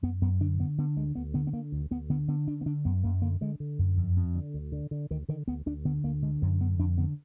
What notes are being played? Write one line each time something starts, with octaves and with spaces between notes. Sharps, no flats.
F#2 B3
F#2 B3
D3 D4
D3 B3
D3 B3
D2 G#3
D2 B3
D3 B3
B3
D3 A#3
D2
D2 B3
D3 B3
D3 B3
D3 D4
B3
D3 D4
F#2 B3
F#2 A#3
D3 A#3
D3 G#3
D3
F#2
F2
F2
D3
D2
D3
D3
D2 D#3
D3 D#3
D2 B3
D2 D4
D3 B3
D2 A#3
D3 G#3
F#2 F#3
D3 B3
F2 D4
D3 B3